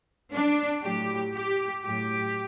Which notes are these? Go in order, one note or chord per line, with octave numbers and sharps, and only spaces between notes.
D4
A2 F#3 G4
G4
A2 F#3 G4